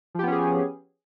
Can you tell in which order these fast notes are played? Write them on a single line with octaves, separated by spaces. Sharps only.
F3 G4 B3 C#4 G#4